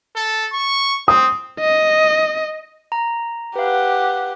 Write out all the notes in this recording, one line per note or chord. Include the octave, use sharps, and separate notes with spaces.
A4
C#6
C4 D#6
D#5
A#5
G4 B4 F5 F#5